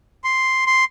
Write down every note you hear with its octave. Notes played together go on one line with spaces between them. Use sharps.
C6
C6